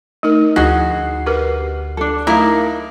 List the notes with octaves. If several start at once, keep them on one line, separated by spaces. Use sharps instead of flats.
A3 D#4 A#4 D#5
D2 F3 D#4 E4 F#4 G#4 C7
G4 A#4 B4
D4 A4
A3 D#4 E4 A#4 F5 D6